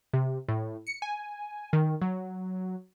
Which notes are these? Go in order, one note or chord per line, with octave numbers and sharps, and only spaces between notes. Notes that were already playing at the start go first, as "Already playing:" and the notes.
C3
A2
C#7
G#5
D#3
F#3